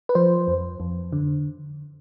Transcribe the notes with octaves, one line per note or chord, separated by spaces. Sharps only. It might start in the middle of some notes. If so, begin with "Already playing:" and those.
B4
F3 C5
F2
F2
D3